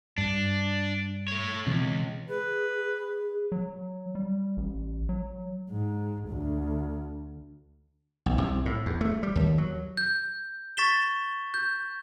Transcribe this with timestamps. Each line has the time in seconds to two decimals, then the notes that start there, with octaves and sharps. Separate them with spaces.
0.18 G2 D4
1.28 A3 C#5
1.66 C#2 B2 E3 C4
2.29 G#4 B4
3.52 F#3
4.15 G3
4.57 A1
5.09 F#3
5.70 G#2
6.29 D2
8.26 B1
8.38 C2
8.66 A2
8.86 E2
9.01 A3
9.23 G3
9.35 D#2
9.58 F#3
9.97 G6
10.77 C#6 A6 B6 E7 G7
11.54 G6